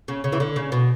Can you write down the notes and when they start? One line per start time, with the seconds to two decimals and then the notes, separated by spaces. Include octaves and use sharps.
0.08 C#3
0.24 C#3
0.32 E3
0.40 D3
0.56 C#3
0.72 B2